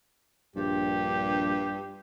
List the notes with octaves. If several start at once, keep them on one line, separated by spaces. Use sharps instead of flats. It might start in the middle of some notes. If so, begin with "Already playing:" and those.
A#1 G2 G4